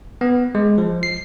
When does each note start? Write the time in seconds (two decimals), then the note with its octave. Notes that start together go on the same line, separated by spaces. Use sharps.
0.21 B3
0.55 G#3
0.78 F3
1.03 C7